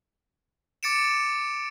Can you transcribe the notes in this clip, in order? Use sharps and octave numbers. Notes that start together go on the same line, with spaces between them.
D6 A6 C#7 D7 E7